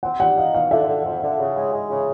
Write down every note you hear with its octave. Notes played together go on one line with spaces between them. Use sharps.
C4 F#5
G3 F#5
D#4 F5
B2 F5
D3 E5
D3
F2
D3
C#3
G#3
G#3
C#3